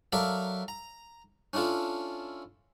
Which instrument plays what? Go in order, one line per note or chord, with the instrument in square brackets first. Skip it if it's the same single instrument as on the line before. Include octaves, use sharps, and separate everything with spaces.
[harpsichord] F#3 A4 A#4 D5 E5 F5
A#5
C#4 D4 E4 F4 A4